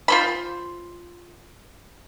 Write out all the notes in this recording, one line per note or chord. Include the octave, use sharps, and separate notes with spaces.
F4 C5 B5